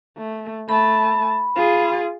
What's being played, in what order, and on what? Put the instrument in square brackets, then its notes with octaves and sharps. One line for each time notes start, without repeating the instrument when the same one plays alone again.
[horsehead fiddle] A3
[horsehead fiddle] A3 A5 [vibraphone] B5
[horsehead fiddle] F4 G#4